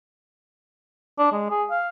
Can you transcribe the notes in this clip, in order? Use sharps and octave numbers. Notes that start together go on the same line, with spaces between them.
D4
G#3
G#4
F5